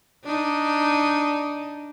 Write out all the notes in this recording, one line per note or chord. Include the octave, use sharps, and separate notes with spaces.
D4 D#4